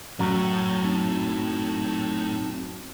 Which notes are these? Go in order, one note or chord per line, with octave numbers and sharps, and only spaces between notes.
F#2 A2 F#3
C4 D#4 A5